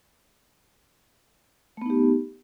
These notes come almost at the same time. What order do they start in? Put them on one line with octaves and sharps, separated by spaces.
A3 B3 D#4 G4